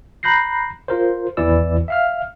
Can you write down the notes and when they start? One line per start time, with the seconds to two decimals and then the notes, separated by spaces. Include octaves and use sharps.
0.23 A#5 B5 F#6 G6 A#6 C7
0.88 F4 A#4 C5
1.37 G#1 E2 E3 E4 D5 E6
1.88 E5 F5 F6